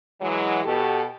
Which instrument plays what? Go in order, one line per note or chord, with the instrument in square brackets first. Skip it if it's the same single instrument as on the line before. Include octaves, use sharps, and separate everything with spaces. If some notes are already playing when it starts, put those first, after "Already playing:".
[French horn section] E3 F#3 G#3
B2 G4 A4